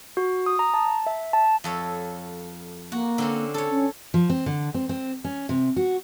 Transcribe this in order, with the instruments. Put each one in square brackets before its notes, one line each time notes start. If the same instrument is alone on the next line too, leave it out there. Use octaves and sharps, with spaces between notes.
[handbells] F#4
D#6
A#5
A5
E5
A5
[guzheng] F2 A4 C#5
[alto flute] A#3 [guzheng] F#4
[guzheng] D3 C4 C#4
A4 C#5
[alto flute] C#4
[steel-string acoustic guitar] F3
C4
D3
C4
C4
C#4
C3
F#4